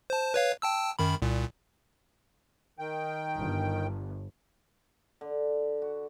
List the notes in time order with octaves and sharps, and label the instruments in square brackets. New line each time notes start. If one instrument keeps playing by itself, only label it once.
[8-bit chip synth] C5 A5
B4 C#5 F5
G5 A5 E6
F#2 D#3 B5
C2 A#2
[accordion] D#3 G5
[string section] G1
[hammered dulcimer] D3
F#4